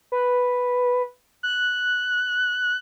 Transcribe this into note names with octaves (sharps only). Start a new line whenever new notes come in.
B4
F#6